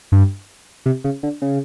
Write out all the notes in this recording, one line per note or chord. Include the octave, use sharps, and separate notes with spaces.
G2
C3
C#3
D3
C#3